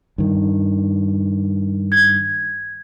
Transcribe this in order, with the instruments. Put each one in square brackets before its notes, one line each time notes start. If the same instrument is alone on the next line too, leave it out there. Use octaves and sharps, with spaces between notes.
[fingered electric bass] G2 D#3
[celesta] G#6